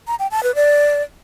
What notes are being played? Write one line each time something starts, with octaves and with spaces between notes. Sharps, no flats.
A#5
G5
A5
B4
D5